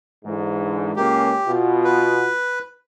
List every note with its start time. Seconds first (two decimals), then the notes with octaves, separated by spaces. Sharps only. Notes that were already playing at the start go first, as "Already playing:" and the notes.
0.25 G#2 D3 E3
0.96 C#2 A#3 C#4 G4
1.47 B2 B3 F4
1.84 B4